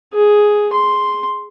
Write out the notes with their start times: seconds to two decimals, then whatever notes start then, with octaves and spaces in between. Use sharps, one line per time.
0.13 G#4
0.73 C6